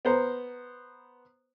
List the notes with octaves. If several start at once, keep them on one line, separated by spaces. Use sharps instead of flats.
B3 C5 A#5